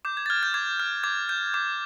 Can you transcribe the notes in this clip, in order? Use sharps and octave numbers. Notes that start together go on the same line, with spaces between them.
D6 G6
G#6
A6
F6 G#6
G6
D6 G#6
F6
D6 G#6
G6
D6